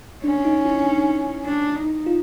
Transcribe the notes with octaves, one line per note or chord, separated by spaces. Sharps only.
C#4 D4
D#4
E4
D4
D#4
F4